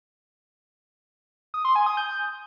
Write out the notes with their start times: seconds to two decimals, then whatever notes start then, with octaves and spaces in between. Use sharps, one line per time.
1.54 D#6
1.65 C6
1.76 G#5
1.86 D#6
1.97 G6